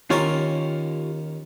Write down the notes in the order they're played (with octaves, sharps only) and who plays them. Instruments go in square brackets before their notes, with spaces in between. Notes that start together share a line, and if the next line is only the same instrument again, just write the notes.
[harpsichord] D#2 C#4 A#4 [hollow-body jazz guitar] F4 G4 C#5